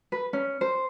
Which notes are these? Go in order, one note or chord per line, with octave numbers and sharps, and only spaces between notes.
B4
C#4
C5